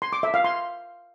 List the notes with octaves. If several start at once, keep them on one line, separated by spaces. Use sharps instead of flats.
C6
D6
E5
F5
C6